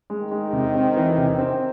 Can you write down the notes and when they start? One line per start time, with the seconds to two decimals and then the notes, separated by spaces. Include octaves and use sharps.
0.10 G#3
0.21 D#3
0.32 G#3
0.53 C3
0.75 C4
0.96 E3
1.18 C3
1.39 C4